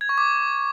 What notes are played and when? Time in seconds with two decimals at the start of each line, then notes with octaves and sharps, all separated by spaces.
0.01 G#6
0.09 C#6
0.18 D6